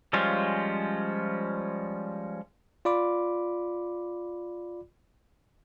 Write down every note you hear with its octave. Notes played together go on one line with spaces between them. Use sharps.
F3 G3 G#3 C#4 F4
F4 D5 B5 D6